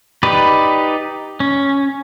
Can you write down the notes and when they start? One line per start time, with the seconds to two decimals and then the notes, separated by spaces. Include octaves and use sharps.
0.23 D#4 G4 B4 D5
1.40 C#4